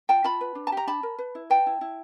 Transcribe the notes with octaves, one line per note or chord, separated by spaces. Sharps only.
F4 G5 A5
F4 A5 B5
B4
D4
A5
G4 A#5
D4 A5 B5
A#4
B4
E4
B4 G5 A5
E4
E4